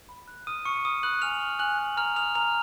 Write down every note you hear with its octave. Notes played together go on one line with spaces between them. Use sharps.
B5
F#6
D#6 F6 D#7
C#6 F6 C#7
B5 D#6 D#7
B5 F#6 F#7
G#5 F6 F7
C#6
G#5 F#6 F#7
F#6
A#5 F6 F7
D#6 F6 F7
A#5 F6 F7